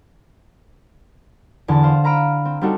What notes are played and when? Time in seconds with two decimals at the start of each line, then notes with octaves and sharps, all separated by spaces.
1.68 E2 D3 A5 A6
1.83 C5 F5
2.04 F5 A#5 B5 F6 D7 E7
2.45 C4
2.61 G3 C4 D4 D#4 F#4 A4